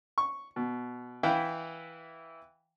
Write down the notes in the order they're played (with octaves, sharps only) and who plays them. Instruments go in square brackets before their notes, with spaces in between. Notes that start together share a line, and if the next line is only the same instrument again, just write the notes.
[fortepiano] C#6
B2
E3 E4 F5 G5